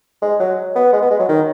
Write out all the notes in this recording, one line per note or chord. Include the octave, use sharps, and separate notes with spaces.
G#3
F#3
B3
G#3
B3
G#3
F#3
D#3